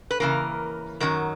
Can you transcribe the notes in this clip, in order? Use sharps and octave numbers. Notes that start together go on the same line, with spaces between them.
B4
C#3 E3 A#3 A#4
F#2 D#3 F#3 A#4